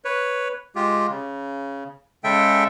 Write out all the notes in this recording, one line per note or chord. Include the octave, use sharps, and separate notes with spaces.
B4 C#5
G#3 F4 G4
C#3
C#3 G#3 A4 E5 G5